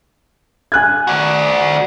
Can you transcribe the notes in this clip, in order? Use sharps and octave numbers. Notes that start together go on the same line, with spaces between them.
G#5 F#6 G#6
F#4 D5